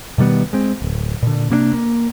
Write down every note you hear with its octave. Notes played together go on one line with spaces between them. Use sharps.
B2 D#3 G3 B3
G#3 C4
D1
A#2 D3
C3 A#3 B3 D4
A#3